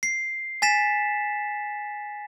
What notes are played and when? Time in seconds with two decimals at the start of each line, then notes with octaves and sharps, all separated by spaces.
0.03 C7
0.62 G#5 A6 B6 E7